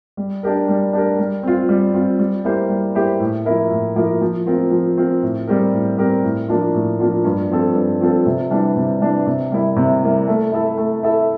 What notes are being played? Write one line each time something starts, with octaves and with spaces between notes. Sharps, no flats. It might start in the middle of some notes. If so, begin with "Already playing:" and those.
G3
D4 G4 A#4
G3
D4 G4 A#4
G3
C4 F4
G3
C4 F4
G3
A#3 E4 G4 C5
G3
A#3 E4 G4 C5
A2
F3 A#3 E4 A#4
A2
F3 A#3 E4 A#4
F3
C4 F4 A#4
F3
C4 F4 A#4
A2
G3 C4 G4 A#4
A2
G3 C4 G4 A#4
A2
F3 A#3 D4 F4
A2
F3 A#3 D4 F4
G2
F3 C4 F4 A4
G2
F3 C4 F4 A4
C3
E3 G3 D4
C3
E3 G3 D4
C3
G3 A#3 E4
C3
G3 A#3 E4
A3
E4 A4 E5
A3
E4 A4 E5